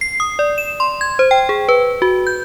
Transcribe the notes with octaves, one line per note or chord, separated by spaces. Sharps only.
C7
D#6
D5
E7
C6
G#6
C5
G5
G#4
B4
F#4
G6